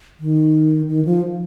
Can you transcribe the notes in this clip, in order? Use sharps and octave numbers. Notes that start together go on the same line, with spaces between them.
D#3
D#3
F3